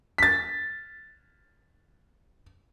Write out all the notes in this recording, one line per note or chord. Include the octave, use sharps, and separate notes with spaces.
A6 B6